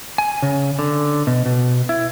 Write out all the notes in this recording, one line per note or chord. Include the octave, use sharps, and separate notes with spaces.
G#5
C#3
D3
B2
B2
E4